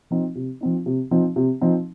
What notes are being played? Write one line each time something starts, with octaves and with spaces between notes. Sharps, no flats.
F3 C4 D#4
C3
F3 C4 D#4
C3
F3 C4 D#4
C3
F3 C4 D#4